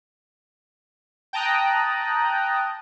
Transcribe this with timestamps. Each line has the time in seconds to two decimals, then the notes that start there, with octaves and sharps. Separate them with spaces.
1.33 G5 A5 A#5 D#6 F#6